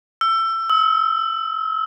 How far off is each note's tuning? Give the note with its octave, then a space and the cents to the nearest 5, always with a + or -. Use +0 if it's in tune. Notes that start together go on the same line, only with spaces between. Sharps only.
E6 +25
E6 -35